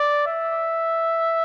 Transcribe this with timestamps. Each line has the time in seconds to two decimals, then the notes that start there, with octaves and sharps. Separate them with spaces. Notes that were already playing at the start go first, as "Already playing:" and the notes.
Already playing: D5
0.27 E5